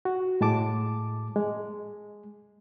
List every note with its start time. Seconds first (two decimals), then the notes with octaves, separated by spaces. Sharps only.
0.05 F#4
0.41 A2 G#3 A5 D6
1.36 G#3